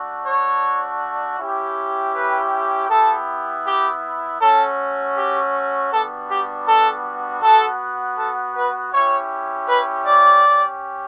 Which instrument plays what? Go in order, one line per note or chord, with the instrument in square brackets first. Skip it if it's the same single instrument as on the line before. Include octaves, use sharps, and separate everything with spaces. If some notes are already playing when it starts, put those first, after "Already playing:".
Already playing: [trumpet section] A3 D4 F#4
C#5
C#4 E4 G4
B4
B3 E4 G4 A4
G4
A3 C#4 F#4 A4
G4
G3 B3 D4 F#4 A4
G4
A4
B3 F#4 A4
A4
B4
C#4 E4 G4 C#5
B4
D5
C#4 G4